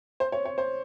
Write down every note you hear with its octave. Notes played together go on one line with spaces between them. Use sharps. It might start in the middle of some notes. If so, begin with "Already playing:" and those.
C5
C#5
C#5
C5